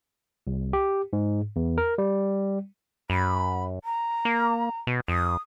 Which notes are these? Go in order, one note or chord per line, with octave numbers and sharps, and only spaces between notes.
C2
G4
G#2
E2
A#4
G3
F#2 B5
A#5
A#3
B2
F2 D#6